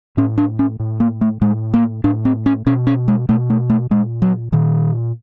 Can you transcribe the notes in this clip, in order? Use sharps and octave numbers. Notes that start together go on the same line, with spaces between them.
A2 C#4
D4
C#4
A2
A#3
A3
A2 G#3
A#3
A2 D4
C4
C#4
B2 C#4
C#4
G#3
B2 A3
A3
A3
A#2 G#3
F#3
A#2 D#3